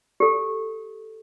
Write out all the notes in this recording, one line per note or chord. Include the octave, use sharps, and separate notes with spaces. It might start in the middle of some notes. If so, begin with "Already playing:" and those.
G4 A4